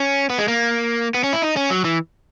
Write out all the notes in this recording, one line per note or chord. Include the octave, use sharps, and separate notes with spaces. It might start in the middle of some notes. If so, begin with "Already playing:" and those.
Already playing: C#4
B3
G#3
A#3
B3
C#4
E4
D#4
C#4
F#3
E3